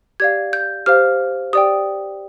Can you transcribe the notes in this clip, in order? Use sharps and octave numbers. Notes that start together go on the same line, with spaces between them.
G4 D5 F5 G#6
G6
G4 C5 F5 F6
G4 D5 G5 D#6